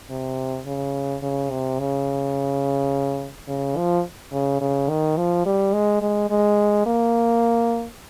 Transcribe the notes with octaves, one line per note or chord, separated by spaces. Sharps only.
C3
C#3
C#3
C3
C#3
C#3
F3
C#3
C#3
D#3
F3
G3
G#3
G#3
G#3
A#3